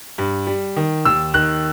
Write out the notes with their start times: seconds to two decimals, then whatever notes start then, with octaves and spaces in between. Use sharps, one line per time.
0.18 G2
0.47 G3
0.76 D#3
1.05 D#2 E6
1.34 D#3 F#6